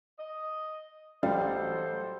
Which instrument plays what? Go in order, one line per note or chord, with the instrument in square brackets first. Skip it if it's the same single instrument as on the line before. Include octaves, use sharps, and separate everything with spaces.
[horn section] D#5
[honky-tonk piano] A1 F#3 F5 [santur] G3 [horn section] A4 C5